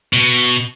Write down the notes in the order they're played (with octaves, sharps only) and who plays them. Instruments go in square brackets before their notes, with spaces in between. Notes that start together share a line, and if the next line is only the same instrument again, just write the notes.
[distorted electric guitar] B2